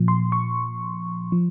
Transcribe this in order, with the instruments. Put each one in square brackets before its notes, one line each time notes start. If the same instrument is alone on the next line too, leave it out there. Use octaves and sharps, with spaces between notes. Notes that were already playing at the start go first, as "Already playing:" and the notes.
Already playing: [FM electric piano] A#2 F3
C6
C#6
F3